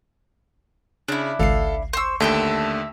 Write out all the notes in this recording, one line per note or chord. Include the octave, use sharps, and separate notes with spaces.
C#3 D4 E4
G#1 C#2 A4 F5 C7
C5 C6 C#6 E6
D#2 D3 A3 E5 G5 A5